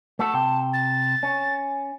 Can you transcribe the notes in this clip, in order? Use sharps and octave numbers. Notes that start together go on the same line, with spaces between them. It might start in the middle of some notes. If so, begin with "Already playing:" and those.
A3 F#4 A4 A5
C3 G5
A6
C#4